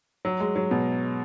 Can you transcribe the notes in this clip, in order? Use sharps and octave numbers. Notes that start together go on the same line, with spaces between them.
F#3
G#3
F#3
B2